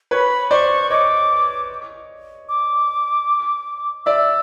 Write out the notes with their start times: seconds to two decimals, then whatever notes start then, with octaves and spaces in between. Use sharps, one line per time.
0.11 B4 C#5 B5
0.51 C5 D5 C#6
0.90 C#5 D#5 D6
2.48 D6
4.06 D5 E5 E6